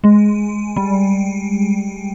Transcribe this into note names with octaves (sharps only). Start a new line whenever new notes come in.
G#3
G3